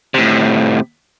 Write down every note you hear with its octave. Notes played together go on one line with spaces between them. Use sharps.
A2 C3